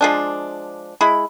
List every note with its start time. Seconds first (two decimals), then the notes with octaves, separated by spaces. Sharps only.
0.01 F3 G#3 D4
1.01 G#3 E4 B5